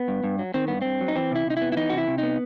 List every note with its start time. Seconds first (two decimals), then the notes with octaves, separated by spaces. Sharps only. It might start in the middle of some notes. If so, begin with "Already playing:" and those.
Already playing: B3
0.08 G2
0.24 G2
0.39 F#3
0.54 D#3 C4
0.68 G2 B3
0.82 G2 C4
1.01 F#3
1.08 D#4
1.15 E3 C4
1.31 C3 E4
1.46 C3 D#4
1.57 B3 E4
1.72 E4
1.77 E3 D#4
1.90 F#4
1.93 C3
1.98 E4
2.08 C3
2.18 B3 D#4